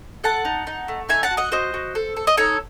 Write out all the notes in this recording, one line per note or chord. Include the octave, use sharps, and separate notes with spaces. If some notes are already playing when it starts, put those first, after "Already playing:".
A4 F#5 A5
D#4
D#4
A3
D#4 E5 G#5
F#5 A5
F#4
D#5 F#5
F#4 C5 D#5
F#4
A4
A4
D#5
D#4 A4 C#5